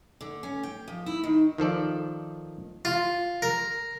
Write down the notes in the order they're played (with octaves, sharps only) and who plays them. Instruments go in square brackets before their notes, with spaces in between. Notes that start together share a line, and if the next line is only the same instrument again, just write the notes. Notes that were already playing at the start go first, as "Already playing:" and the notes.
[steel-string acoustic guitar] D3
C#4
G5
F3
E4
D#3
[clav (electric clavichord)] D#3 F3 A4 D5
[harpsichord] F4
A#4